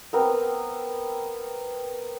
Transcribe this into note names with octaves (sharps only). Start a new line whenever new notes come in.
B3 C4 A#4